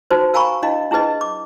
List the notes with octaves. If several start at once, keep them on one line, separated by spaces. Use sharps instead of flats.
D#4 F#4 B4 C5
A#4 F5 G#5 A#5 B5 C#6
D4 E4 D#5 F5
D4 E4 G#4 B4 D#5
D6